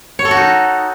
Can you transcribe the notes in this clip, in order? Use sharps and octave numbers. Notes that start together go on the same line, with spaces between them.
C#5
A4
F#4
D#4